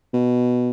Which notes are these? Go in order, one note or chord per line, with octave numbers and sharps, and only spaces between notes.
B2